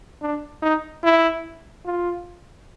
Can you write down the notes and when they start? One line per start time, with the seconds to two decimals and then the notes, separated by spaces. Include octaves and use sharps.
0.22 D4
0.62 D#4
1.04 E4
1.85 F4